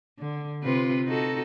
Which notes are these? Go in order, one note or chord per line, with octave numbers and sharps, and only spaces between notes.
D3
C3 F4 B4
D#4 F#4 A4